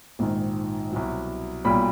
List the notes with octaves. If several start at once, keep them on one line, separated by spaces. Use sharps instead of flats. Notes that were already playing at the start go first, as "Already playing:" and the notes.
A#1 G#2 D#3
C2 B2 F#3
B1 A#2 G3 B5